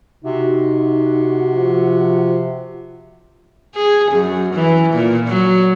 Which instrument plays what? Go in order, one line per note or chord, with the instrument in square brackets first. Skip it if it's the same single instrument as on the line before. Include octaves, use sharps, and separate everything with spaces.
[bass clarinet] C3 [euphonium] D#4 [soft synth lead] F#4
[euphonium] F3
[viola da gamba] G#4
F#2
E3
A#2
F#3